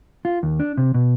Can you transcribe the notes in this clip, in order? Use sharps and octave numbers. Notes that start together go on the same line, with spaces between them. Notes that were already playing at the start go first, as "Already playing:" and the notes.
F4
D#2
D4
C3
B2